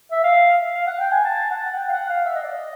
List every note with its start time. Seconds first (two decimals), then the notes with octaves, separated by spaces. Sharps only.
0.12 E5
0.23 F5
0.74 F5
0.87 F#5
1.00 G5
1.11 G#5
1.24 A5
1.50 F#5
1.75 G5
1.88 F5
1.93 F#5
2.09 F5
2.25 E5
2.34 D#5
2.43 D5
2.52 D#5